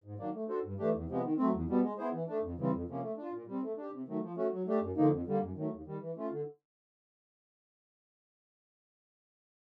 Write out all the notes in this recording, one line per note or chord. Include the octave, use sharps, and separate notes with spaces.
G#2
D#3 F#3 A#3 D4
A3
D4 F#4 A4 C5
G2
E3 A3 D4 G4
E2
C3 F3 G#3 B3
D#3
F#3 A3 C4
E2
B2 G3 B3
G#3
B3 E4 G#4 C5
E3
A3 D4
F2
C#3 E3 G3 C4
F2
C3 F3 A#3 C#4
A3
D4 F4
A#2
G3 C4
A3
D4 G4
C3
D#3 F#3 A3
F3
A3 C#4 F#4
F#3
A3 D4 G4
F#2
D3 F3 A#3 D#4
F2
D3 G3 A#3
F#2
D#3 F#3 A3
D#2
D#3 G3
E3
A3 C#4 F4
D3